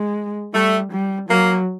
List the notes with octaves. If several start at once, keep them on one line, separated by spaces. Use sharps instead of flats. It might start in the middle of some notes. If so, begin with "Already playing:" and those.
Already playing: G#3
G3 A3
G3
F#3 A#3